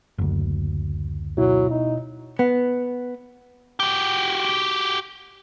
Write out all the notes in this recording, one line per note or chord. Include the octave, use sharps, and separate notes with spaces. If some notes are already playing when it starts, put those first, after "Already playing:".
F#1 D2
B2 F#3 E4
D#4
B3
F#4 G4